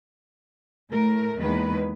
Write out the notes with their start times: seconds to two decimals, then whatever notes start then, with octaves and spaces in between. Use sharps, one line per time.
0.92 A2 A3 A#4
1.40 E2 D#3 G#3 A#3 B4